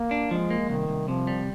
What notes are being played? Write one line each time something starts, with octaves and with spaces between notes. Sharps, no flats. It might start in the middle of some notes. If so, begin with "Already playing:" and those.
Already playing: A#3
D4
F3 G#3
A#3
C2 D#3
C2
C3 F3
G3